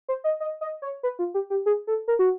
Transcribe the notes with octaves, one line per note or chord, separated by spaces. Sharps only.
C5
D#5
D#5
D#5
C#5
B4
F4
G4
G4
G#4
A4
A#4
F#4